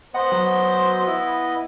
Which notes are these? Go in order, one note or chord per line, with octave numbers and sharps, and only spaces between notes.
B3 C5 D#5 F#5
F#3
E4